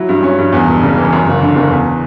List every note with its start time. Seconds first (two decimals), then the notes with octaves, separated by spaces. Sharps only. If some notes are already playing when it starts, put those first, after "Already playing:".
Already playing: F#3 E4
0.09 G2
0.23 C#4
0.38 G2
0.52 E2
0.67 E1
0.82 C#3
0.97 E3
1.12 F#2
1.27 F#1
1.42 D3
1.56 F#1
1.70 E2